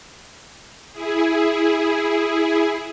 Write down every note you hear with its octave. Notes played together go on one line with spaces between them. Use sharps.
E4 G#4